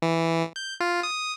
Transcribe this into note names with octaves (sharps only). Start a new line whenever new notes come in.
E3
G6
F4
D#6